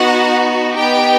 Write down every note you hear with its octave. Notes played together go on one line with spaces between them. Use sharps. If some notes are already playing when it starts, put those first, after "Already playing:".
Already playing: B3 D#4 F#4 F#5
B3 D#4 G4 G5